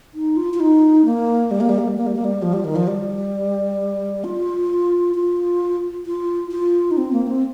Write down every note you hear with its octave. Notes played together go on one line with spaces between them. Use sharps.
D#4
F4
F4
D#4
A#3
G3
A#3
G3
A#3
G3
A#3
G3
A#3
G3
F3
G3
D#3
F3
G3
F4
F4
F4
F4
D#4
C4
A#3
C4